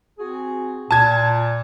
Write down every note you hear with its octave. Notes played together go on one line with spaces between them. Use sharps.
C4 F#4 G#4
A#2 A5 G#6